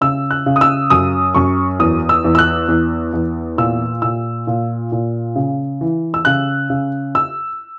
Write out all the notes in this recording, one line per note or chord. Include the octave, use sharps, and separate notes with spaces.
C#3 E6
F#6
C#3
D#6
E6
F#2 D#6
F#2 C#6
E2 D#6
E6
E2
E6
F#6
E2
E2
A#2 E6
A#2 E6
A#2
A#2
C#3
E3
E6
C#3 F#6
C#3
E6